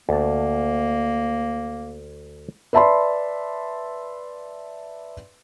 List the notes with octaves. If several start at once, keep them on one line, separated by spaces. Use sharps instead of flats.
D2 A#3 A5
B4 D5 E5 A5 B5 C6